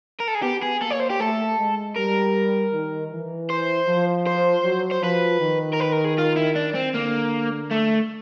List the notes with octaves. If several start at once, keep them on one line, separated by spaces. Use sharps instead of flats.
A#4
A4
G#4
B3 G4
G#4
A#3 A4
C#5
C5
G4
A3 A4
G#3
G3 A#4
D#3
E3
C5
F3
C5
F#3
C5
F3 B4
D#3
A#4
B4
A#4
G#4
F4
E4
D4
C4
D3 A#3
A3